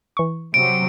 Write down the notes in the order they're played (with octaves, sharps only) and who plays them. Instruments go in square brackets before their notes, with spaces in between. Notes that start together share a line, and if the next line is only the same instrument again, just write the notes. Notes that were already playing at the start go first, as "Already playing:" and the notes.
[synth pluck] E3 C#6
[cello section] C3 F#3 [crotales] D7